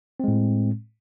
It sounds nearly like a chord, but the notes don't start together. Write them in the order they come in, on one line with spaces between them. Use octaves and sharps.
C4 G#3 A2